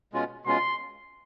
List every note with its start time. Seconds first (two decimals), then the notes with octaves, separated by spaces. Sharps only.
0.13 B2 G#3 C#4 F4
0.45 B2 G#3 C#4 F4 C6